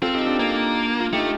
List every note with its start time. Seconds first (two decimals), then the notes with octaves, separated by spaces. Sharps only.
0.02 C4 F4 A4
0.15 D#4 G4
0.26 D4 F4
0.39 A#3
1.00 F4
1.13 A3 D#4 G4